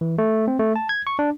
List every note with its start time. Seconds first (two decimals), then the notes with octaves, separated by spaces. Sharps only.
0.01 E3
0.18 A3
0.48 C4
0.59 A3
0.76 A5
0.89 G#6
1.07 C#6
1.19 D4